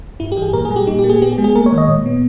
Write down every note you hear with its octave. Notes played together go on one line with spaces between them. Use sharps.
G2 E4
G4
E3
G#4
A#2 A#4
G#4
G3
G4
A#2 D#4
G4
A#3
G#4
B3 G4
G#4
G#3
G#4
A#3 A#4
C#5
D#3
D#5
A#2
B3